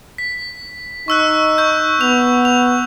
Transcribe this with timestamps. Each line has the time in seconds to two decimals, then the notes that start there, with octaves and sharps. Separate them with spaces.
0.18 B6
1.08 D#4 C#6 E6 F#6
1.58 C#6 G6
2.01 B3 F7
2.45 F7